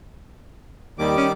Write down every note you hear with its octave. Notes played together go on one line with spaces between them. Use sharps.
D#2 D#3 G3 D6
C#4